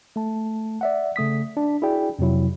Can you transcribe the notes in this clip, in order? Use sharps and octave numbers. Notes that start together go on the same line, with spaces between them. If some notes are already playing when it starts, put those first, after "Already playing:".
A3 A5
D5 E5 F#5
C#3 A3 D#6 B6
D4
E4 F#4 G#4 D5 G5
F2 C3 F#3 E4